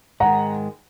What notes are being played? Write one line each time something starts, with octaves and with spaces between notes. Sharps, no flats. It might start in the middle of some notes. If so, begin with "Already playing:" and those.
G#2 D#3 G#3 F#5 A#5